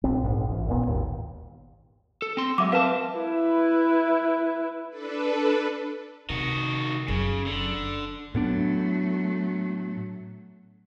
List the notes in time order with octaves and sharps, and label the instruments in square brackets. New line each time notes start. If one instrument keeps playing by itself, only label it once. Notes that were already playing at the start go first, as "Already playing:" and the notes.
[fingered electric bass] A#1 C4
A#1 G#2
A1
D#1 A#2 B3
G#1 D#2
[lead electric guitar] A4
C4 C6
[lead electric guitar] F#3 G#3 [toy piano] E5 D6
[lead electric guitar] C4 A5 [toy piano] A#4 B4 F5
[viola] E4 B4
[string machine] D4 A4 B4
[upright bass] C3 [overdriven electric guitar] D#3 F#4
[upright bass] F#1 F#3 [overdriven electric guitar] C#3
[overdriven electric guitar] D3
[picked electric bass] A2 B3 D4 [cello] F#3 A3